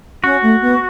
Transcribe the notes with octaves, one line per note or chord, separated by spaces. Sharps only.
C#4 F#4
A3
B3